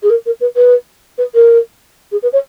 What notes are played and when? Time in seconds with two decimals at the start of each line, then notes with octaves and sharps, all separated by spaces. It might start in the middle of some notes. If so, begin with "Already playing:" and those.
0.02 G#4
0.09 A#4
0.25 A#4
0.40 B4
0.55 B4
1.18 B4
1.34 A#4
2.11 G#4
2.22 B4
2.32 C#5